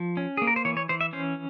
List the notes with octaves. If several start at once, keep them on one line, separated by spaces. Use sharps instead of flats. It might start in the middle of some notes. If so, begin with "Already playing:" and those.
Already playing: F3
C#4
A#3 G#4
A#4
C5
E3 C#5
C#5
E3 C5
E5
C#4 C5